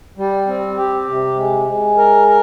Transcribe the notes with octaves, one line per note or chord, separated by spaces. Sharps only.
G3
C4
G4
C3
G#3
G#3
A#4
A#4